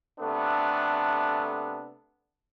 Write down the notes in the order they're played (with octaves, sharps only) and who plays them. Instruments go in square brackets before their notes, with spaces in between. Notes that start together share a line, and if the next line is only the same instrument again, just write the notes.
[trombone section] C3 A3 B3 D4 A4